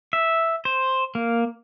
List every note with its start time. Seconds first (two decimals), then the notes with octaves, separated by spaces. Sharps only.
0.13 E5
0.65 C5
1.15 A#3